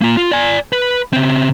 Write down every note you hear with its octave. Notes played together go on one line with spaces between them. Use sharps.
A#3 F4
F4
D5 G#5
B4
C#3 C4